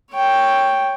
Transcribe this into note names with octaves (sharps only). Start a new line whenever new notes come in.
C#5 G5